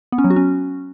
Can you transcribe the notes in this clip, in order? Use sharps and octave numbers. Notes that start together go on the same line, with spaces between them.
B3
C#4
F#3
F#4
C#4